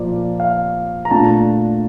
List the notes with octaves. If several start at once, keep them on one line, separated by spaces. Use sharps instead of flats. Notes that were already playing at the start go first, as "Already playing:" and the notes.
Already playing: A#2 F3 A#3 D5
F5
A#5
A#2 A3 D4 F4 A5